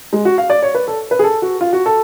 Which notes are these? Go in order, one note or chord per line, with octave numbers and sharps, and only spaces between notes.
G#3
F#4
F5
D5
C#5
B4
A4
B4
G#4
A4
F#4
F4
F#4
A4